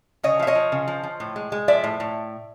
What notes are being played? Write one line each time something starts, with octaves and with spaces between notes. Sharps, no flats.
C#3 C#5 D#5
F3 E5
C#5 D#5
F3
C#3
F3
F3
A2
G#3
G#3
F3 D5 E5
A2
A2